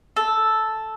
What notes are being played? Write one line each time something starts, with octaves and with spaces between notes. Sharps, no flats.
A4